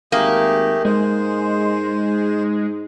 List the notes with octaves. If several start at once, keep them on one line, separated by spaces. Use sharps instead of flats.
G#1 A3 A#3 G4 G#4
G#2 G#3 C5